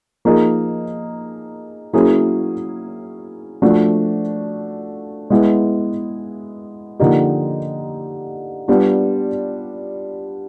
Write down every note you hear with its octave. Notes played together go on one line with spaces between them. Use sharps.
F3 A#3 D#4 G#4
F#3 A#3 C#4 E4 G#4
F3 A3 D4 F#4
G#3 B3 E4 G#4
D3 F3 A#3 D#4 G4
G3 B3 D4 F4